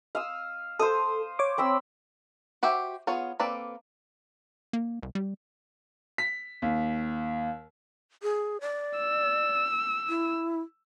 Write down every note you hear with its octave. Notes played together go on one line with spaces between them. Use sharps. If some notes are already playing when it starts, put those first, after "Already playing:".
F5 D#6 E6
A4 C5 F5 D#6
C#5 D6
C4 B5 E6
F#4 G4 C5 E5 G5
B3 F4 G#4 C#5
A#3 C4 A4 B4 D5
A#3
C2
G3
B6
D#2
G#4
D5
E6
E4